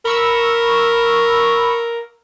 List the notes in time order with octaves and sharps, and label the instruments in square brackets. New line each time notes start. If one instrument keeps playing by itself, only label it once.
[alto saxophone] A#4 [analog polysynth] B5 C#6 E6